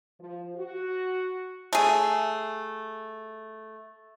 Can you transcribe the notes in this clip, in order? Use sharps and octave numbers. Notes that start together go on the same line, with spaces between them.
F3
F#4
A3 G#4